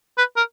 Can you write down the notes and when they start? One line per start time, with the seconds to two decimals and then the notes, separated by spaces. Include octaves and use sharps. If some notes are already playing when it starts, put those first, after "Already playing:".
0.17 B4
0.36 A#4